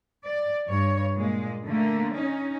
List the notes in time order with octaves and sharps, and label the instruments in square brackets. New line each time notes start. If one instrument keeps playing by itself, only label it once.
[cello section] D5
G2 C#5
A#2 G#3
D3 A3 A#3
C#4 D#4